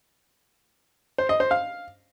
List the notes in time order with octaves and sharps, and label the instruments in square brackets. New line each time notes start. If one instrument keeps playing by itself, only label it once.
[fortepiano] C5
D#5
C5
F5